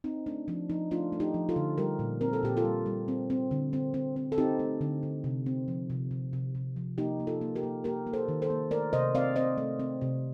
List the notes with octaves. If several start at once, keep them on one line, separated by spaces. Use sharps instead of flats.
C4 D#4
A3 D4
F3 D4
F3 D#4
A3 D4 F4
A3
D#4 G4
F3
F4 A4
D3
G3 G4 A#4
A#2
C4 A#4
A4
A#2 G4
F4 A4
G3
G3
C4
C4
D3
C4
C4
C4
A4
C4 D#4 G4
A3
D3
D3
C3
C4
F3
C3
C3
C3
C3
F3
A#3 D#4 G4
A#3
F4 A4
A#3
G4 A#4
A#3
A#3 G4 A#4
A#3
A4 C5
D#3
A4 C5
A#3
A3 A#4 D5
C3 C5 D#5
C4 D5 F5
C4 C5 D#5
A3
C4
C3